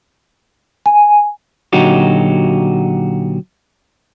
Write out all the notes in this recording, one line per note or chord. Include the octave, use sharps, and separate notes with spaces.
G#5
A#2 D3 F#3 D#4 F#4 G4